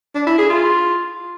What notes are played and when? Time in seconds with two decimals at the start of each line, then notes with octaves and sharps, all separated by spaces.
0.15 D4
0.26 E4
0.38 G#4
0.50 F4